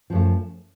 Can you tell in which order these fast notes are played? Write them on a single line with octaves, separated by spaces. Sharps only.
F3 F#2 A3